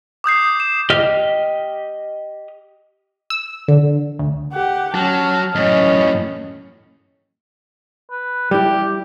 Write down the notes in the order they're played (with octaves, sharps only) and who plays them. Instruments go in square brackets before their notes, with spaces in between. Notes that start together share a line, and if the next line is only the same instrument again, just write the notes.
[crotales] D6 D#6 G6 C7
E7
[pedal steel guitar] G4 D#5 F6
[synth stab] E6
D3
D2
[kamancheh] G4 F#5
[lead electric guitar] F#3 [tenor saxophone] C#4 [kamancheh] A5 [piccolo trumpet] F6
[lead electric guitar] F#2 A2 [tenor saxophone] C#4 [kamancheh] D#5
[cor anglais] B4
[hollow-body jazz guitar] G3 E4 [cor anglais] G4